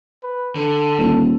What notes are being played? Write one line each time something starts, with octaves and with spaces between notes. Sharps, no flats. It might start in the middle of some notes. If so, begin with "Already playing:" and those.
B4
D3 A4
D#1